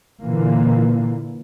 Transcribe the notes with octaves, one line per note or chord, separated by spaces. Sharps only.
A#2 D3 E3 A#3